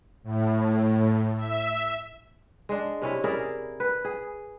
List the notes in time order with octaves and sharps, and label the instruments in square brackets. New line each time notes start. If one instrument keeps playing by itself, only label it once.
[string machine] A2
E5
[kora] G#3 D4
C3 C#4 E4
E4 G#4 A#4 D5
B4
G#4